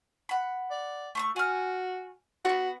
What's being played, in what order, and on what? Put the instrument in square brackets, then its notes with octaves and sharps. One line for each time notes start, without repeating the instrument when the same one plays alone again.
[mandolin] F#5 B5
[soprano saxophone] D5
[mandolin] A3 C6 C#6
[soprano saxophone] F#4 [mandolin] G#5 F6
[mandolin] B3 C4 [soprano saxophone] F#4